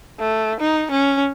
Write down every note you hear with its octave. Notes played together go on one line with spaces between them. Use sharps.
A3
D#4
C#4